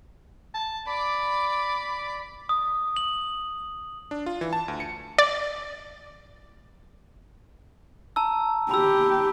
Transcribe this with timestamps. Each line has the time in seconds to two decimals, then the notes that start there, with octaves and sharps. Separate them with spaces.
0.54 A5
0.87 D5 B5 D6
2.49 D#6
2.96 F#7
4.11 D4
4.26 F4
4.41 E3
4.53 A5
4.68 D2
4.80 C#7
5.18 D5
8.16 A5 A#5 E6
8.71 G4 B5 E6